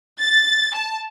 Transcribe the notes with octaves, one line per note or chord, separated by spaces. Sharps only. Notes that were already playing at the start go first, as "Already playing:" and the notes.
A6
A5